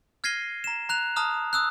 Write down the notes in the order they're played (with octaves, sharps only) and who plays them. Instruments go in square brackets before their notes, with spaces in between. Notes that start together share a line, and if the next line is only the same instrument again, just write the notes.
[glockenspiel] F6 G#6 A#6 C7 D#7 G7
A#5 E7
A#5 F#6 F7
A5 A#5 D#6 F6
D#6 E6 F#6